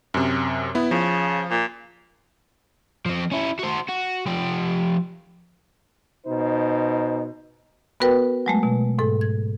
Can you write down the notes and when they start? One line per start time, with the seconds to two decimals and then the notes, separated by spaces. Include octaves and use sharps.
0.14 F#2 C3
0.75 B3 E4
0.91 C#3 F3
1.50 A#2
3.06 F3 C4
3.32 C#4 E4
3.59 F#4 C5
3.89 F#4
4.27 F3 G4
6.26 B2 D#4 C5
8.00 B3 F#4 A#4 B4 G5
8.46 F#3 G#3 A3
8.63 B2
8.99 G#2 A4
9.21 G#6